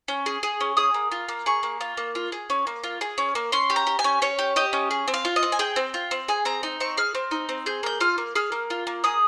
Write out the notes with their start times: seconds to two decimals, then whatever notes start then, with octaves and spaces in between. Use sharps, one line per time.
0.08 C#4
0.26 G#4
0.43 G#4
0.61 C#4
0.77 G#4 D#6
0.94 A#3
1.11 F4
1.28 A#3
1.46 G#4 C#6
1.63 A#3
1.81 F4
1.97 A#3
2.15 F4
2.32 G#4
2.50 C#4
2.67 A#3
2.83 F4
3.01 G#4
3.18 C#4
3.35 A#3
3.52 C#4 C6
3.70 G4
3.76 A#5
3.87 G4
3.99 G#5
4.04 C#4
4.22 C#4 C#5
4.39 G4
4.56 G4 D#5
4.73 C#4
4.91 G#4
5.08 C4
5.14 F5
5.25 F4
5.36 D#5
5.43 C4
5.52 G#5
5.59 G#4 G5
5.76 C4
5.94 F4
6.11 C4
6.28 G#4 G#5
6.45 C4 A#5
6.63 D#4
6.80 C4 C#6
6.97 G#4 F6
7.15 C4
7.31 D#4
7.49 C4
7.66 G#4 G6
7.83 A#3 G6
8.00 F4 F6
8.18 A#3
8.35 G#4 F6
8.52 A#3
8.70 F4
8.87 A#3
9.04 G#4 D#6